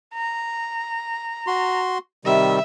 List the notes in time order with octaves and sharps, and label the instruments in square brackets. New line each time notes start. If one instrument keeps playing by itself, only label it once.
[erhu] A#5
[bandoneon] F#4 C6
[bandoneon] C3 D#3 G3 [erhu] E5